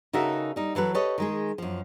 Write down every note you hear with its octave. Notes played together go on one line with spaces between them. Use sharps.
C#3 D#4 F#4 A4 A#4 E5
G3 D#4
E3 F#3 A4 B4
G4 A4 B4 C#5 D#5
D#3 G#3 G#4
F#2 F3